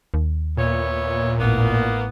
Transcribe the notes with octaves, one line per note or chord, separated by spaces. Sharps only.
D#2
A#2 B3 E4 C#5
A1 A#3 B3